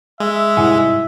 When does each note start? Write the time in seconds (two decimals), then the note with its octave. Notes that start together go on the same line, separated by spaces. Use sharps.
0.20 G#3 E5
0.57 G#2 C3 G3 E4 F#5 G#5